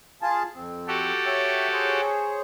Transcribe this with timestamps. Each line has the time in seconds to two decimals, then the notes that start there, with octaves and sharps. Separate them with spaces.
0.22 F4 G#4 A5
0.55 F2 C4
0.88 F#4 G4 A4
1.26 C#5 E5 G5
1.72 G#4 C5 C#5